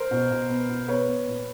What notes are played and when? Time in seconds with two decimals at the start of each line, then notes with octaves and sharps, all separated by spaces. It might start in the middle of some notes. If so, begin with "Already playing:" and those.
Already playing: A#4 C5
0.11 B2
0.31 B2
0.50 B3
0.69 B2
0.88 B3 B4 C#5
1.08 B3
1.27 A#2